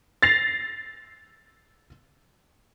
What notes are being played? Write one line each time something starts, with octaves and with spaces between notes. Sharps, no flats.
A6 A#6 C7 F7